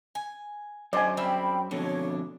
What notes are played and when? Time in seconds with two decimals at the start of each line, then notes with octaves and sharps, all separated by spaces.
0.15 G#5
0.93 F#2 C5 D5 D#5 G#5
1.17 G3 C4 E4 G5 B5
1.71 F2 B2 D3 D4 C#5